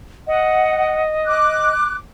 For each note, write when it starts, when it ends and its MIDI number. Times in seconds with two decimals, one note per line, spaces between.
0.27 1.73 75
0.27 0.99 78
1.26 1.94 86
1.26 1.94 90